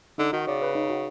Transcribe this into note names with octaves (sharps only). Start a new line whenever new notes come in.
D3 D#4
D#3 F#4
C#3 D5
B4
D#4
F#4